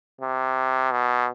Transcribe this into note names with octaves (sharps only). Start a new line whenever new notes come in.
C3
B2